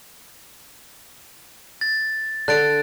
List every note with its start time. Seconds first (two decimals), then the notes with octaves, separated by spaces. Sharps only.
1.81 A6
2.48 D3 F#6 A6 D7